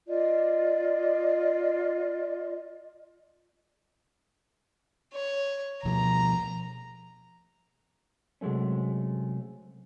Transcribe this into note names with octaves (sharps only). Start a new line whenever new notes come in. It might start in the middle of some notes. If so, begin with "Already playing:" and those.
F4 D5 D#5
C#5
B2 F3 A#5
C3 F#3 G#3 A3 C#4